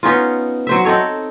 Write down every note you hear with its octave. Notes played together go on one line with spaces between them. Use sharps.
B3 C#4 D#4 F4
F#3 C5 E5
C4 D#4 A4 C#5